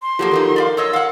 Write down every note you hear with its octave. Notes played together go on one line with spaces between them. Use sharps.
C6
F3 F#3 A#3 F4 G4 A4
E3 F#3 D#4 A#4
D5 D#5 F5
A4 C#5 D#5 E6
F5 F#5